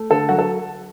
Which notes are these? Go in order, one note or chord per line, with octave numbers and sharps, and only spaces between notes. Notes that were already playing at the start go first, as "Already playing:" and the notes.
Already playing: A3
D3 A4
F#3 F#4
A4